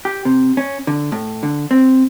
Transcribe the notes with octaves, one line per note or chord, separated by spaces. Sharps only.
G4
C3
C#4
D3
A2
D3
C4